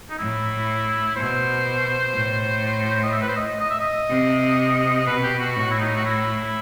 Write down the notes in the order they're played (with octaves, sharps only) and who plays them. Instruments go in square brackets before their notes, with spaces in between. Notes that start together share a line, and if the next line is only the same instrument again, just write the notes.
[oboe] D#4
[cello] A2 [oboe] E4
[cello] B2 [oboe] C5
[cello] A2
[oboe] D#5
E5
B4
C5
D#5
D#5
E5
D#5
[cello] C3
[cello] B2 [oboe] B4
[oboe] G4
F#4
[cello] A2 [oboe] F#4
[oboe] E4
D#4
F#4
E4